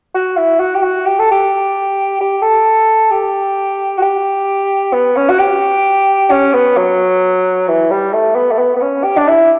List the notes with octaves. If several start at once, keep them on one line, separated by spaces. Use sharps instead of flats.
F#4
E4
F#4
G4
F#4
G4
A4
G4
G4
A4
G4
F#4
G4
B3
C#4
F#4
G4
C#4
B3
F#3
E3
G3
A3
B3
A3
B3
B3
C#4
G4
D4
E4